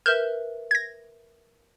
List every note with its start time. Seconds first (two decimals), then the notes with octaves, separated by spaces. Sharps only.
0.06 A#4 B4 E5 F6 G6 E7
0.71 G#6 A#6